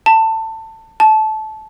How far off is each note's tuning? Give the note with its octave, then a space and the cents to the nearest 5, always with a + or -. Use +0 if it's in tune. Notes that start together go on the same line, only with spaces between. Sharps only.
A5 +20
A5 -20